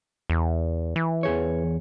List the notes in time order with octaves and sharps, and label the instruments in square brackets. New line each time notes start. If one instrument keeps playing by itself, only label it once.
[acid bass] E2
E3
[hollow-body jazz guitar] E2 G#4 C#5